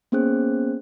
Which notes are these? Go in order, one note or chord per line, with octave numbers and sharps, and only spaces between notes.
A#3 B3 C#4 G#4 C5 F#6